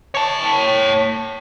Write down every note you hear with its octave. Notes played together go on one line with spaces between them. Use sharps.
C#5 A5